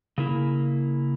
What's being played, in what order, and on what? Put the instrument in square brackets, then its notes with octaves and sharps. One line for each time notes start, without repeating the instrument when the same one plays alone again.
[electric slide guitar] C#3 A#3 E4